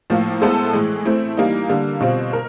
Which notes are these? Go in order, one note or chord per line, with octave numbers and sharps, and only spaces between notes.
A2 F3 A#3
G#3 B3 E4 A4 C5
A2 E3 G#3
A3 C4 E4
E3 G3 A#3 D#4
D3 G3 A#3
B2 G3 C4 F4
A#4